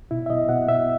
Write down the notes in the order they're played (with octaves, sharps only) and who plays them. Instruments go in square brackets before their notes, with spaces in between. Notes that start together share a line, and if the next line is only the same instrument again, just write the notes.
[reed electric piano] B2 E4
E5
B2 D#5
B2 F#5
B2 E5